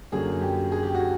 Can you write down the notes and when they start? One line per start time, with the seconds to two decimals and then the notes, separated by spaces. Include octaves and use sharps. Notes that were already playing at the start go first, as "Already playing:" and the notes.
0.12 F#2 D3 F#3 A#3 G#4
0.41 G4
0.72 G#4
0.83 G4
0.95 F#4